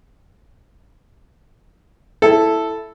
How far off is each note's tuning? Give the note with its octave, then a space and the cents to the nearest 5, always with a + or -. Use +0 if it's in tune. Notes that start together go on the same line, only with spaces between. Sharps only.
E4 +0 A4 +0